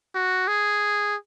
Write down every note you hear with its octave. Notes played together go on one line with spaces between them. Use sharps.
F#4
G#4